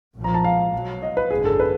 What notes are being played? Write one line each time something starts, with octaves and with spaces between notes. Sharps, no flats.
B1 A#2 F3
A#5
A5
F5
B1 B2 F#3
D#5
B4
G#1 F#2 D3 G#4
A4
B4